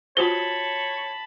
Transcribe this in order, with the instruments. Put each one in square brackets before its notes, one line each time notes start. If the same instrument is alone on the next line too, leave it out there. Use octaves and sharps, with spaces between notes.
[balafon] F4 F#4 C5 [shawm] C#5 [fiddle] A5 B5 [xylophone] G7